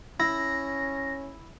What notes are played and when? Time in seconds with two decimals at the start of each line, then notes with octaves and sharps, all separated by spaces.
0.20 C#4 E4 A#6